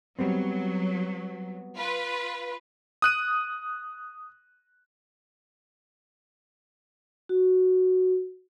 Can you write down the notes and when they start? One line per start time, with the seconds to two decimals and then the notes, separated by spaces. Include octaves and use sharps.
0.19 F#3 G3 B3 C4
1.77 F4 B4
3.02 D#6 F#6 D#7
7.29 F#4